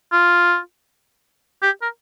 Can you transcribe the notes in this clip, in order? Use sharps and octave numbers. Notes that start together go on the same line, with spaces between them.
F4
G4
A#4